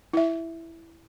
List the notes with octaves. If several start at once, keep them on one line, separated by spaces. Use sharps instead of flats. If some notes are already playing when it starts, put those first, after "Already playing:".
E4 E5